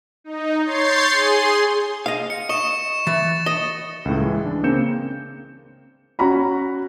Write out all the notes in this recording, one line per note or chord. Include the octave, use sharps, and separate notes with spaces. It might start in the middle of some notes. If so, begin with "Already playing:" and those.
D#4
C#5 C6 G6 A6 C7
G#4 C6
D#5 F5
C#7
D#5 C#6 C#7 E7
E3 A6
D#5
C#2 A2
E3 G#3
D4
C#3 A#3 C4 G6 C#7 E7
C#4 F#4 A#5 B5